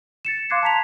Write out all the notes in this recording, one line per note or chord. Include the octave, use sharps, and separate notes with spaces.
A6 C#7 E7
F5 C6 D6 F#6 G#6 C7
A5 A#5 B6 F7